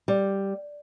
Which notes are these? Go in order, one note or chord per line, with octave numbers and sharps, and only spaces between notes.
G3